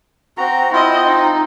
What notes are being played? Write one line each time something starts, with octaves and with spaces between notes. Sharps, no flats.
C4 F#4 A#5
C4 E4 F4 D#5
D#4